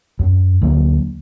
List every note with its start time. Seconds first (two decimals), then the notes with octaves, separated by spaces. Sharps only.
0.19 F#2
0.62 D2 F#3 A#3